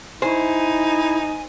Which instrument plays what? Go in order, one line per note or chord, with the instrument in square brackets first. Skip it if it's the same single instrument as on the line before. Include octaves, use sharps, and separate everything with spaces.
[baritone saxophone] D#4 [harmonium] E4 [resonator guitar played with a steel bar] C5 [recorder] G#5